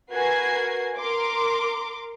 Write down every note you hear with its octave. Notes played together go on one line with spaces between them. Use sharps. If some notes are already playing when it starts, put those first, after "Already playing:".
F#4 A#4 B4 G#5 G#6 C7
A#4 C6 D6